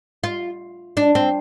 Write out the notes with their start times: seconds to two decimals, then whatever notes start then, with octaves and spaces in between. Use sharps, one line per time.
0.24 F4
0.97 D4
1.15 C4